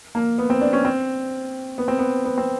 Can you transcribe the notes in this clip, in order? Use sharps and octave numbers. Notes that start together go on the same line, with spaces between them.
A#3
B3
C4
D4
C#4
C4
B3
C4
B3
B3
C4